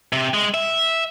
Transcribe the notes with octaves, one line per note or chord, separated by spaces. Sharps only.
C3
G#3
E5